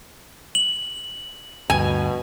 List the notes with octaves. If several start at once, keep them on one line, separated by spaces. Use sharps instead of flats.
F#7
D2 G2 B2 G#5